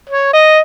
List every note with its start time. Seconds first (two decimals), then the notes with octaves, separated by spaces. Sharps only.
0.10 C#5
0.34 D#5